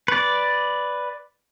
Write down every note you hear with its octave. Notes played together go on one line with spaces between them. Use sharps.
B4 D5